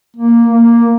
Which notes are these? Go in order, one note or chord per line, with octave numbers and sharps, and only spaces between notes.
A#3
A#3